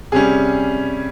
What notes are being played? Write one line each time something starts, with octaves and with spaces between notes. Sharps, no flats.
C3 G3 C#4 G#4